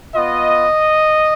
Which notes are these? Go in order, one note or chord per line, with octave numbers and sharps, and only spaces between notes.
B3 F4 D#5